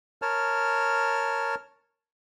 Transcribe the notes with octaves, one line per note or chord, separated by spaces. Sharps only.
A#4 C#5 A5 F6